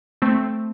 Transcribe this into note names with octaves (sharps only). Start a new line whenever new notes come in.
A3 C4